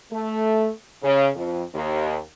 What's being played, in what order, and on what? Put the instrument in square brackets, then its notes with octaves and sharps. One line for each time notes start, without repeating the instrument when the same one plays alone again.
[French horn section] A3
C#3
F2
D#2